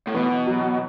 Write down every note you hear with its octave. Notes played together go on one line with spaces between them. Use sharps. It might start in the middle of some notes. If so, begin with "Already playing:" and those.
A2
B2 E3
F#3